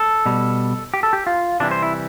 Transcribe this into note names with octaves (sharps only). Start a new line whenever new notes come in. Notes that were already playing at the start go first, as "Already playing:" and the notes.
Already playing: A4
B2 G3
G4
A4
G4
F4
C3 E3 G3 D4
C5
E4